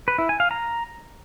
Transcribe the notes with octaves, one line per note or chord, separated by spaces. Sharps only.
B4
E4
G#5
F5
A#5